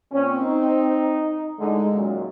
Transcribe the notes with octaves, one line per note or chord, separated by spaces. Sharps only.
A#2 C4 C#4
D#4
A2 D3 G#3 D#4
F#2 A#2 D#3